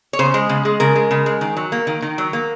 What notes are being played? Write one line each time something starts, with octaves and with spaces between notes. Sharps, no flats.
C#5
C#3 C5
G#3
C#3
G#3
C#3 A#4
G#3
C#3
G#3
D#3
F#3
A#3
D#3
D#3
F#3
A#3